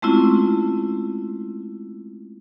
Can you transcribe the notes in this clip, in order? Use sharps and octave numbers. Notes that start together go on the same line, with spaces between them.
G#3 A3 C4 C#4 E4 F4